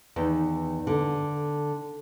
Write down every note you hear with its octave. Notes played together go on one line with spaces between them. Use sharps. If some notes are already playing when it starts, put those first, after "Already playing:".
E2 D#3
D3